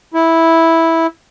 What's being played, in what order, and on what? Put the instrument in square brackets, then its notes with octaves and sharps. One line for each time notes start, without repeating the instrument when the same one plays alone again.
[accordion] E4